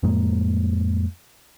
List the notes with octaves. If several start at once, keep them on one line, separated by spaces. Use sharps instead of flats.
F2 A2 G#3 A#3